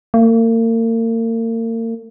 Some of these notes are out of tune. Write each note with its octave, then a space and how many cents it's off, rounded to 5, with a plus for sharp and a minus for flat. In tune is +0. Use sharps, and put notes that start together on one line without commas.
A#3 -40